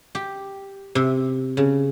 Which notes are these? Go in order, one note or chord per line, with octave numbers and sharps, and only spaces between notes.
G4
C3
C#3